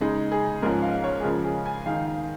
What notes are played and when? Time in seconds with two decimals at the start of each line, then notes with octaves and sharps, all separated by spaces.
0.01 C#3 G#3 D#4
0.32 G#4
0.62 G#2 F3 C#4 A#4
0.82 F5
1.04 C#5
1.20 G#4
1.23 C#3 F3 G#3 A#4
1.44 G#4
1.66 G#5
1.86 D#3 G#3 D#4 F5
2.07 F5